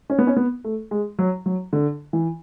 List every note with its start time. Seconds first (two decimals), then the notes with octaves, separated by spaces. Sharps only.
0.10 C#4
0.19 B3
0.27 C#4
0.36 B3
0.64 A3
0.91 G#3
1.19 F#3
1.46 F#3
1.73 D3
2.13 E3